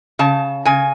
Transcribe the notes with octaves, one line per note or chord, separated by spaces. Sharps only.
C#3 A5
C#3 G#5